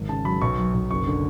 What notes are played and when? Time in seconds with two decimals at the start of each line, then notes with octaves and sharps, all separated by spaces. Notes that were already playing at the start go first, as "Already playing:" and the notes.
Already playing: G#1
0.09 C#3 A5
0.25 F#3 B5
0.41 B1 C#6
0.58 F#3
0.74 B1
0.91 F#1 C#6
1.07 D3